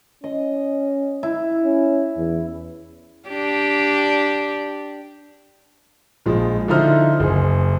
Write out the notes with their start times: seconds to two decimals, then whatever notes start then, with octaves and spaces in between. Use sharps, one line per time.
0.24 C#4 D#5
1.23 E4
1.65 C#4
2.17 E2
3.29 D4 G4
6.26 A#1 F3 G#3
6.68 D3 F3 D#4 E4 C5 F6
7.20 F#1 G#4